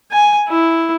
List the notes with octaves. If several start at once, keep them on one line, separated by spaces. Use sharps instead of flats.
G#5
E4